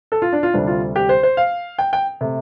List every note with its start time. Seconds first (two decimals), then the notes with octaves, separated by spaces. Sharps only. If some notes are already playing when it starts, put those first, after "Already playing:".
0.12 A4
0.22 F4
0.32 D4
0.43 F4
0.53 D2 C3 G3 C4 D4
0.67 F4
0.96 G4
1.09 C5
1.23 C5
1.37 F5
1.78 G5
1.93 G5
2.21 C3 A3